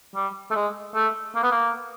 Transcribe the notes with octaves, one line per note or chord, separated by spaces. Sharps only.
G3
A3
G#3
A3
A#3
B3
A#3